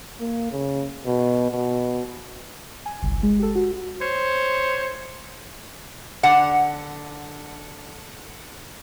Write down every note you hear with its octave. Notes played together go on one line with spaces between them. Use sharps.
A#3
C#3
B2
B2
G#5
G1 C2
G#3
G4 A4
F#4
C5 C#5
D3 F#5